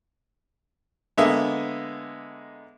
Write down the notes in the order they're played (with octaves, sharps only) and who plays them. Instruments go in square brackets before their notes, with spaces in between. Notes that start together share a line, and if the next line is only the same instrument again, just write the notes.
[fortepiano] D3 G#3 A#3 B3 E5